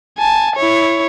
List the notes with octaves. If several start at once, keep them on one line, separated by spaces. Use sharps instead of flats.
G#5 A5
E4 C#5